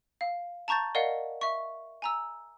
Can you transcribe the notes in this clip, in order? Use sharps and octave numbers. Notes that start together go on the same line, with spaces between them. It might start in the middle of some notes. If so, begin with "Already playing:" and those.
F5
A5 A#5 C#6 G6 A6
A#4 D5 D#5 F5 F#5
E5 C#6
G#5 A#5 E6